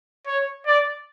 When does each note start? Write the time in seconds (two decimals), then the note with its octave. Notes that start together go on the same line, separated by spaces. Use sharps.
0.26 C#5
0.66 D5